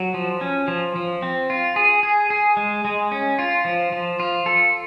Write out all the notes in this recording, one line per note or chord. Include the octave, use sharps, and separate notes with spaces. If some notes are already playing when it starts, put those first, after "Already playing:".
Already playing: F#3
F3
C#4
F3
F3
C4
F4
G#4
G#4
G#4
G#3
G#3
C#4
F4
F3
F3
F4
A4